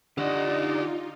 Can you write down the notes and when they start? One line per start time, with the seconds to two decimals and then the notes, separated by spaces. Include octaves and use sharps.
0.18 D3 D#4 F4 G4 D5 D#5 F#5